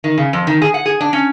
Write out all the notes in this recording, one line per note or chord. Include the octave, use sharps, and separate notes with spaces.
D#3
C#3
F2
D#3
G#4
F#5
G#4
D4
C#4